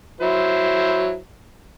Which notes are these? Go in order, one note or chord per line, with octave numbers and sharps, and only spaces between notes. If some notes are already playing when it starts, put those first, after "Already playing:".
F#3 E4 C5